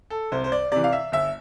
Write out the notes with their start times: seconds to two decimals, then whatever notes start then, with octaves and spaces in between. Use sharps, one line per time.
0.10 A4
0.32 C2 C5
0.44 C5
0.52 D5
0.72 C3 E3 D5
0.84 F5
0.92 E5
1.12 G1 E5